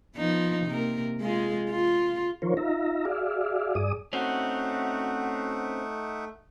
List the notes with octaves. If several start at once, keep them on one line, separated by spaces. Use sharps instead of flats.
F3 B3 D#4
C3 A#3 A#4
G#3 F4 G#4
F4
D#3 F3 F4 A#4 C5 C#5
D#4 F4 E5 A#5
F#4 G#4 D5 E5 F5
G2 G#4 D5 D#6
A3 C4 C#4 D#4 F#4 E5 F#5